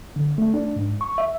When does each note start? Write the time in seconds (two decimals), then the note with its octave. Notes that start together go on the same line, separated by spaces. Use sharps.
0.16 D3
0.38 A3
0.54 D4
0.76 G#2
1.01 C#6
1.18 E5